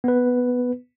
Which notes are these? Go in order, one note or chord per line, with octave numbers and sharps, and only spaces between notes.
B3 B4